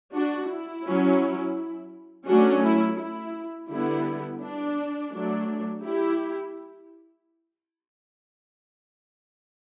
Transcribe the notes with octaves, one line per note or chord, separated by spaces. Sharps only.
D4 F#4
E4
F#3 C#4
F#3 A3 C#4 D4 F#4
E4
E4
D3 G3 B3 E4
D4
F#3 A3 D4
E4 G4